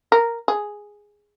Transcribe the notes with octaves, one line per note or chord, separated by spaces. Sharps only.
A#4
G#4